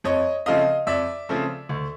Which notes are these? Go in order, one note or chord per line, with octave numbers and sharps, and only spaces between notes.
F2 C#5 D#5
C#3 F3 A3 C4 D#5 F5
F2 D5 E5
C#3 F3 A3 C4
D2